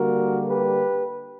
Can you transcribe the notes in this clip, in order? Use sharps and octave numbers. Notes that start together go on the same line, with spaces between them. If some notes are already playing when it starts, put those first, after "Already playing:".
Already playing: D3 G3 A#3 F#4 A#4
G4 B4